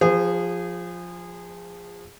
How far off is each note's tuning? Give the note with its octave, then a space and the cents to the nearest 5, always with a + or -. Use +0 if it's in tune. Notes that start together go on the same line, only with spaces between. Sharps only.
F3 +10 G#4 -25 C5 -35